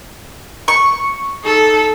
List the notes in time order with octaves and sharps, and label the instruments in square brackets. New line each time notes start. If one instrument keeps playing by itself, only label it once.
[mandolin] C#6
[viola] D#4 A4